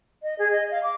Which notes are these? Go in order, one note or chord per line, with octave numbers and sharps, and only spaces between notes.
D#5
G#4
D#5
F5
D6